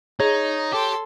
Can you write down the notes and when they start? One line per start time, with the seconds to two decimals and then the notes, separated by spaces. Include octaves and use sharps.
0.20 D#4 G#4 C#5
0.72 G4 A4 C6